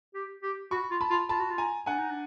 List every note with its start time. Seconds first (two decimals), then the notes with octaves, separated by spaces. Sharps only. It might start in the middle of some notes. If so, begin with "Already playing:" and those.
0.14 G4
0.43 G4
0.71 F#4 B5 C#6
0.91 F4
1.01 A5 B5
1.10 F4
1.29 F4 A5 B5
1.39 F#4
1.50 F4
1.58 G#5 A#5
1.86 D4 F#5 G#5
1.99 D#4
2.10 D4